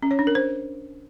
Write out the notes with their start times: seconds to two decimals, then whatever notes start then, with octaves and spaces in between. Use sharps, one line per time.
0.03 C#4
0.11 C#5
0.19 D4
0.27 A#4
0.35 C5